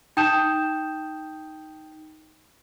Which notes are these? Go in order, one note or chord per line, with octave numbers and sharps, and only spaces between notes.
D#4 G5 A5 D#6 G6 E7